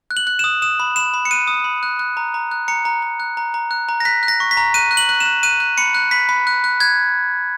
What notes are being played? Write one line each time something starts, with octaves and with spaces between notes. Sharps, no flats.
F#6
F#7
F#6
D#6 E7
D#6 E7
B5
B5 E7
B5
C#7
F#6 D#7
D#6
B5
F#6
F#6
A#5
A#5
F#6
A#5 C#7
A#5
A#5
F#6
A#5
A#5
F#6
A#5
A#6
F#6 B6
F#6
A#6
C#6
B6
A#5
F#6 D#7
F#6
F#7
F#6
E7
F#6
F#6 D#7
F#6
B5 C#7
F#6
B5 B6
B5
F#6
F#6
F#6 G#6